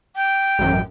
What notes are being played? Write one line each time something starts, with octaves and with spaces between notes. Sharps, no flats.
G5
A1 F#2